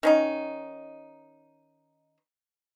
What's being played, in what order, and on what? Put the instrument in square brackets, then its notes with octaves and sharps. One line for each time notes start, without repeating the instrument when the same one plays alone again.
[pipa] D#3 C#4 D#4